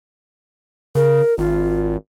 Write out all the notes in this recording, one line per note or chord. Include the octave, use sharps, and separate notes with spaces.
C#3 A#4
G#1 F4